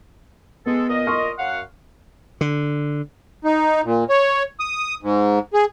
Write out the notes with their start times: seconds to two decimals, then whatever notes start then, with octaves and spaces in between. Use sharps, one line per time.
0.66 G#3 B3 G#4 A4
0.89 A#2 A#4 D#5
1.07 C6 C#6 F6
1.38 F#2 F5 F#5
2.41 D3
3.45 D#4
3.84 A#2
4.09 C#5
4.60 D#6
5.03 G#2
5.54 G#4